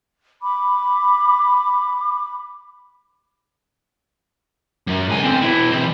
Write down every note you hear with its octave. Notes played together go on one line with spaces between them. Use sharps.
B5 D6
F#2
C#2 G#5
D3 C4
B2 E4
E3 C4